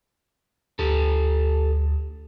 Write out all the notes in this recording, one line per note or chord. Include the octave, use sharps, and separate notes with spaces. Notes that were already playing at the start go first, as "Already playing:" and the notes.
D2 G4 A4